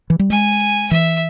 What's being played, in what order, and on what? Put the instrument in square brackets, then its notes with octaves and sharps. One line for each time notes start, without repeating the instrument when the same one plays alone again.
[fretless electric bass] E3
G3
[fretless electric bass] G#3 [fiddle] G#5
[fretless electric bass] E3 [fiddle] E5